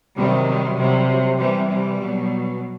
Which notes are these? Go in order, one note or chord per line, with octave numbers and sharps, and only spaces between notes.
C3 D#3 F#3 G3
G3
C3 F#3 G3
F#3
C3 E3 G3
G3
B2 F#3